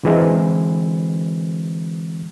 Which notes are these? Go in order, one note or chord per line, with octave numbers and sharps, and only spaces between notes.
D3 E3 G#3 C4